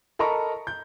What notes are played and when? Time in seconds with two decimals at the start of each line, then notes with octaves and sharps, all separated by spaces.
0.19 A4 A#4 D#5 A#5 B5 C#6
0.67 G6